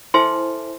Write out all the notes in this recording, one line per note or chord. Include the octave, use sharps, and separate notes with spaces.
E4 A4 C5 E5 G#5 C6